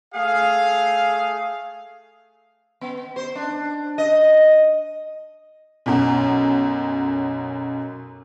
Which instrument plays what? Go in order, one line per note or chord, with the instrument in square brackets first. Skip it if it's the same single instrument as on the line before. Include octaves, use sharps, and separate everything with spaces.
[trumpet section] A3 G#4 F5
[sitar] B3
C5
D4
D#5
[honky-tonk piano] B1 F#2